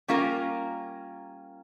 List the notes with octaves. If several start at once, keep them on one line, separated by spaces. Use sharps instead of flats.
G3 A#3 C#4 F4 A#4